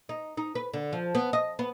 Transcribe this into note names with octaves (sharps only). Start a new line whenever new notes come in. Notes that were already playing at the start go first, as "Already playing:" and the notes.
D#4
D#4
B4
D3
F3
B3
D#5
B3